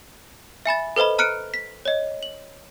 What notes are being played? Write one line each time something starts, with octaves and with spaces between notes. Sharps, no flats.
E5 G#5 B5 A6
A4 B4 C5 D#5 B5
A#5 F6 F#6 C#7 D7
B6
C#5 D#5
F#7